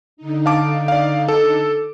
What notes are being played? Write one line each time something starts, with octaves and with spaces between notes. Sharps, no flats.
D3 D#4
F5 A5 D6
D5 F5
A4